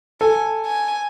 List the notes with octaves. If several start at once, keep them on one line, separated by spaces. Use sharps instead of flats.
A4 G#5
G#5